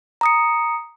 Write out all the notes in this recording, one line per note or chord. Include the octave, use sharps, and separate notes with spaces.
A#5 D#6 C#7